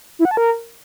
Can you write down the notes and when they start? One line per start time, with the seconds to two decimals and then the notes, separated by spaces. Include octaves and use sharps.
0.19 E4
0.25 F#5
0.31 A5
0.37 A#4